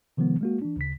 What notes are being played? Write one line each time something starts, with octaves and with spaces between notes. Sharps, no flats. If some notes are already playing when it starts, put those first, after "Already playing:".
C3 D#3 F3 G#3 B3
G#3 A#3 F#4
E3 D4
D2 C#3 B6